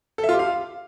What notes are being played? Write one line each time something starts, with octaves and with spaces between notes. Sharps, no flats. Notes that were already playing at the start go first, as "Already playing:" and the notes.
A4
E5
F4
G4
F5